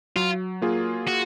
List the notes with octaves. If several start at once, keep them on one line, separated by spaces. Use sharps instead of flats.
F#3 F4
A#3 F4 G#4
F#4